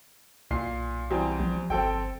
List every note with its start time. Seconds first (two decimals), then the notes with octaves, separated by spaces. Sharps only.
0.51 B1 A#2 C7
1.10 E2 G3 C4
1.40 F3
1.70 G1 C4 A4 G5